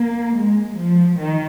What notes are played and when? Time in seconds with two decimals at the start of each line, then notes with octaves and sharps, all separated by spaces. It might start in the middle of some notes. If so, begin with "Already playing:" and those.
Already playing: A#3
0.36 G#3
0.76 F3
1.17 D#3